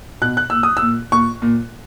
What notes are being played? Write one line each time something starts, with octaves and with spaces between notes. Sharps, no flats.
B2 F#6
F#6
A#2 E6
D#6
E6
A#2
A#2 C#6
A#2